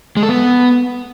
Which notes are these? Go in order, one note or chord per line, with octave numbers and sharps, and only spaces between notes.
G#3
A4
B3